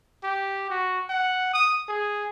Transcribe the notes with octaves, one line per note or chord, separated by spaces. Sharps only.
G4
F#4
F#5
D#6
G#4